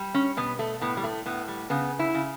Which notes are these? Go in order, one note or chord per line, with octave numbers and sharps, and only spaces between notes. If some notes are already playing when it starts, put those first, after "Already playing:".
Already playing: G3
C#4
B2 B3
A3
A2 B3
G3
A3
A2 B3
G3
C#3 B3
E4
C#3